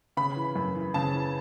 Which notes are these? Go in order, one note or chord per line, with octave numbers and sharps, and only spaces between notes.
C#3 B5
E3
F#2
E3
C#3 A5
E3